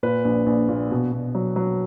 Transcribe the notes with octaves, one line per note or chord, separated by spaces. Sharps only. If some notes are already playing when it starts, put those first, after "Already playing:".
A#2 B4
A#1
A#1
A#2
B2
B2
F#3
F#3